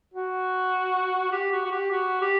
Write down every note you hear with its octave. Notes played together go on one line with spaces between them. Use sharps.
F#4
G4
F#4
F#4
G4
F#4
G4